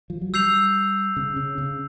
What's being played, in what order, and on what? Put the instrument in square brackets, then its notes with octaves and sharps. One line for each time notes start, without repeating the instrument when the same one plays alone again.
[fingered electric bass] F3
F#3
[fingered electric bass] G3 [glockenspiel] E6 G6 C7 F7
[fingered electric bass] C#3
C#3
C#3